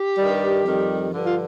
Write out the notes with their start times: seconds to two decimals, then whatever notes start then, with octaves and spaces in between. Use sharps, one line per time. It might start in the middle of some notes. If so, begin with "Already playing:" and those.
Already playing: G4
0.18 G2 D#3 G3
0.65 F2 D#3 G3
1.10 G2 D3 F3
1.26 F4